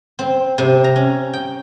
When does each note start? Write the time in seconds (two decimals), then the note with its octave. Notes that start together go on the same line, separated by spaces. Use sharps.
0.19 C4
0.58 C3
0.84 A#5
0.96 C#4
1.33 G5